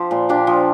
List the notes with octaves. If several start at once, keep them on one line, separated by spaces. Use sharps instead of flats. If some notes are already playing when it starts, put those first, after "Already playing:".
Already playing: F3 G4 C5 G5
A#2
A#2 D4 G4
F3